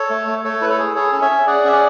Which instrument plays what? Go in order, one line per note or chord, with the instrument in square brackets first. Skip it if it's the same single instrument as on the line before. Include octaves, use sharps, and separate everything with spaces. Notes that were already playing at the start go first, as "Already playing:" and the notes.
Already playing: [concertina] A4 C#5
A3
A3
A3 A4 C#5
E4 B4
A4 C#5
G#4
G#4 A4 C#5
C#4
C#5 E5
C#4
G#4 D5 F#5
C#4 E5
D5 F#5